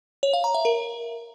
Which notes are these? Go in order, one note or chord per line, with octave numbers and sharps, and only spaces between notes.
C#5
F5
A#5
E5
A#4